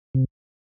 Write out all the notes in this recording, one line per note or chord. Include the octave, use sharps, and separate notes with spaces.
C3